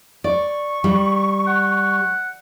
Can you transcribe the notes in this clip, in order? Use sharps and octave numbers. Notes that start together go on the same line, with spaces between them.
D5 C#6
G3
F#5